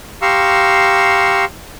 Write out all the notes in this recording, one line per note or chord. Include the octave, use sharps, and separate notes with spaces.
G4 F5 A#5 C6 C#6 E6